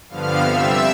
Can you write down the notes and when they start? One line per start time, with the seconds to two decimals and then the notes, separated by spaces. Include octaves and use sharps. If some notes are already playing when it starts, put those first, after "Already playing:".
0.09 G2 D3 F3 B3 F5 F6
0.40 C3 G3 C4 E5 E6